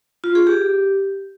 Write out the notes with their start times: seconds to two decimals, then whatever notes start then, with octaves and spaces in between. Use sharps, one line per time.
0.24 F4
0.35 G#4
0.47 G4